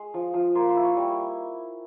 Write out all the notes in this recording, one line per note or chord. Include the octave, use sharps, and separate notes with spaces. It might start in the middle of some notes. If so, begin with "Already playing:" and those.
Already playing: G#3 C6
F3
F3
A#3 C6
C6
E4
C#6
G3